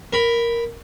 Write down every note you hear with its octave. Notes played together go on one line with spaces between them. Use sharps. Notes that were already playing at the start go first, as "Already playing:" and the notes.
A#4 B5